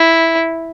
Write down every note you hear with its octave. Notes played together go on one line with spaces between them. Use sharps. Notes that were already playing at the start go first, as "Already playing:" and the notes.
Already playing: E4